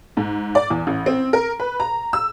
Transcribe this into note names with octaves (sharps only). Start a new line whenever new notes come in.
G#2
D5
E2
A1
C4
A#4
B4
A#5
E6